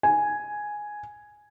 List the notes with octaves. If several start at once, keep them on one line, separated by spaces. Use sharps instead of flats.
G#5